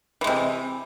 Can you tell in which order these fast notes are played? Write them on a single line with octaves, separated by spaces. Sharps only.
E3 G#3 C3